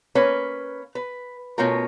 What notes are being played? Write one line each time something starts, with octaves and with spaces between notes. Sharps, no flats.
A#3 C#4 B4
B4
B2 A3 C#4 F4 A#4